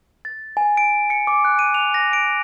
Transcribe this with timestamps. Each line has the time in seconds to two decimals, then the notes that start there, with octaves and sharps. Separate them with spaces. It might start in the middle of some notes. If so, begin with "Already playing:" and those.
0.25 A6
0.57 G#5
0.77 D7
1.10 C#7
1.27 D6
1.45 F#6
1.59 D#7
1.74 F7
1.94 A#6
2.13 D7